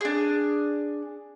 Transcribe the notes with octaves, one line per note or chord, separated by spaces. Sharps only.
D4 G#4